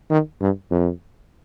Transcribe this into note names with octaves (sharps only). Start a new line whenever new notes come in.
D#3
G2
F2